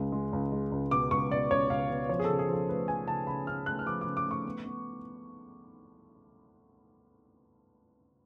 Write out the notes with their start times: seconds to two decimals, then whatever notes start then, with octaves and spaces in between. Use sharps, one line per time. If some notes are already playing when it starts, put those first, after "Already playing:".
Already playing: C#2 G#3
0.12 G#3
0.33 C#2
0.52 G#3
0.72 C#2
0.91 B2 D6
1.11 C#2 C#6
1.31 B2 D5
1.51 C#2 C#5
1.70 C#2 F5
1.90 B2
2.09 F3 C#5
2.19 G#4
2.24 C#3 A4
2.39 G#4
2.48 F3 A4
2.69 A3 B4
2.88 F3 G#5
3.08 C#3 A5
3.27 C#3 B5
3.47 C#3 F6
3.66 A3 F#6
3.79 F6
3.87 F3 D6
4.01 D6
4.06 C#3
4.17 D6
4.25 A3
4.31 C#6
4.46 B3
4.66 B3